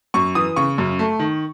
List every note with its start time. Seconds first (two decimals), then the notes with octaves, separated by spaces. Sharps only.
0.14 F#2 C#6
0.35 E3 D#6
0.56 C#3 C#6
0.78 F#2
0.99 A3
1.19 D#3